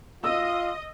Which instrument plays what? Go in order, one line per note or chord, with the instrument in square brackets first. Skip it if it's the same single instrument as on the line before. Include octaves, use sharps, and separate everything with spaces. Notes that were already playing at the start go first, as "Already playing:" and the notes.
[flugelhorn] F4 [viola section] D#5 [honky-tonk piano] E6